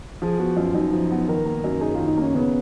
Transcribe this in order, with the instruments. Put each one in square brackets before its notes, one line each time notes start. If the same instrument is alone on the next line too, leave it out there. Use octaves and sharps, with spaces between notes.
[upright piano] F3 [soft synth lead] G#4
[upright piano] B3 [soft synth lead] F#4
[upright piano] F#2 [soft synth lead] F4
[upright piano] F#2 [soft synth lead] D#4
[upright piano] F3
B3
[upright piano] D#3 [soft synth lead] A#4
[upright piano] A#3
F#2
[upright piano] D#4 [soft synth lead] G#4
[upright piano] D#3 [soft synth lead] F4
[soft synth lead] D#4
[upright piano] A#3 [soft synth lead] C#4
[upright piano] C#3 [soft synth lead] B3